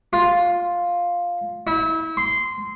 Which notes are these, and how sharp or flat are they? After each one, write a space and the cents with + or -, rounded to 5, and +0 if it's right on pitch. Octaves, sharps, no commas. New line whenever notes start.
F4 +5
E4 -30
C6 -15